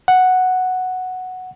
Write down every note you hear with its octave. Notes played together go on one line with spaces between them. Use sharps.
F#5